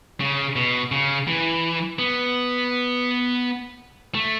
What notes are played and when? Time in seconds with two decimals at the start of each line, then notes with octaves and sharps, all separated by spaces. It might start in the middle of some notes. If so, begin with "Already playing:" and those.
0.20 C#3
0.56 B2
0.92 C#3
1.27 E3
1.99 B3
4.14 A3